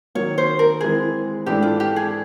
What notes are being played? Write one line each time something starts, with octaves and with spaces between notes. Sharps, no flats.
D#3 F#3 A#3 C#5
C5
A#4
E3 G#3 C4 G#4
G#2 E3 A3 D4 G4
F4
G4
G#4